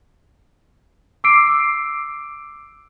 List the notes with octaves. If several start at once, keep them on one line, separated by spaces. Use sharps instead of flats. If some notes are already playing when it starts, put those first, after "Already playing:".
D6 E6 C7 D7